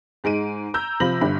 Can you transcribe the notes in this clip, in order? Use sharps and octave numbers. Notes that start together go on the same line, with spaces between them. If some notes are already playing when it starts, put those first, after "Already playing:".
G#2 G#3 D7 D#7
A#5 E6 G6
C3 F3 B5 A#6 F#7
G1 G2 B5